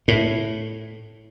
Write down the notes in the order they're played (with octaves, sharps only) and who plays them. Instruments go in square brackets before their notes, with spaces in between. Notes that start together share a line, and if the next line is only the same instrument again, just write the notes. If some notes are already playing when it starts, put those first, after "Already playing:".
[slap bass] A2